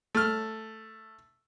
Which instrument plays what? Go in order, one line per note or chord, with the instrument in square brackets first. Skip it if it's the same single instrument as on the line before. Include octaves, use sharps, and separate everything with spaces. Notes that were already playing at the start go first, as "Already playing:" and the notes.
[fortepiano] A3 F6